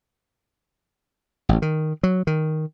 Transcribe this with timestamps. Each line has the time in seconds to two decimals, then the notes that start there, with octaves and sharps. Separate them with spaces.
1.49 A1
1.62 D#3
2.03 F#3
2.27 D#3